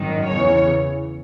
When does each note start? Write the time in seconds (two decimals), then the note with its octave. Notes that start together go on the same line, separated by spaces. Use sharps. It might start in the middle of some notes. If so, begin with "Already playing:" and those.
Already playing: G#1 F#2 D#3
0.28 E2 C#3 E3 C#5